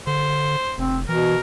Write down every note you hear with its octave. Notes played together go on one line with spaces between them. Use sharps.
D3 C5
F1 C4
B2 E3 A#4